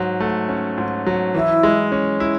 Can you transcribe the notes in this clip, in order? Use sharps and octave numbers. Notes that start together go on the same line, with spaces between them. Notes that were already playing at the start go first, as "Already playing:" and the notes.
Already playing: G#2 F#3
A3
C#4
G#2
F#3
E3 E4
G#3
C#4
E4